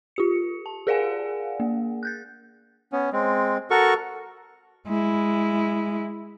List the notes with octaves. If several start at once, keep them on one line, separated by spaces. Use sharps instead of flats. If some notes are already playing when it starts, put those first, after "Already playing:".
F4 G4 C#7
A5
G#4 A#4 D5 F5 F#5 G#5
A#3
F#6 G6 A6
B3 C#4
G#3 C4
F#4 A4 A#4 C#6
G#3 E4